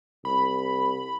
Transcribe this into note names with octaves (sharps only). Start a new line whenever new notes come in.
C2 B5